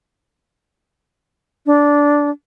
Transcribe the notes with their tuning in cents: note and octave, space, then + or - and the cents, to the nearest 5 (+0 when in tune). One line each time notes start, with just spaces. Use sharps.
D4 -10